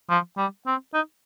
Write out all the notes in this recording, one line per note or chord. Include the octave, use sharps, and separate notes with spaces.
F3
G3
C4
D#4